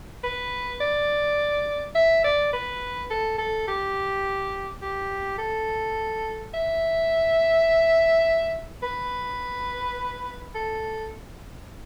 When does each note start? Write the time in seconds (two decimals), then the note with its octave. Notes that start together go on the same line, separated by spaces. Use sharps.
0.23 B4
0.80 D5
1.95 E5
2.24 D5
2.53 B4
3.10 A4
3.38 A4
3.67 G4
4.81 G4
5.38 A4
6.54 E5
8.83 B4
10.55 A4